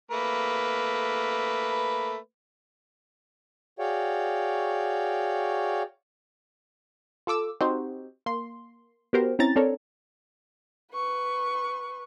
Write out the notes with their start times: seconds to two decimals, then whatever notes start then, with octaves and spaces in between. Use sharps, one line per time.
0.11 A3 A#3 B4
3.79 F#4 G#4 C#5 D5 F5 G5
7.27 F4 A4 D6 E6
7.61 C4 D#4 F#4 G4 C5
8.26 A#3 C6
9.13 B3 F#4 G4 A#4 C5
9.39 C4 C#4 E4 A#5 A6
9.56 C4 D4 A4 A#4 C#5
10.93 B4 C#6